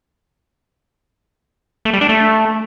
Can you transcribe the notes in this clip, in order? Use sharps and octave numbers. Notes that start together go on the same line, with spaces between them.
A3
G3
D4
A3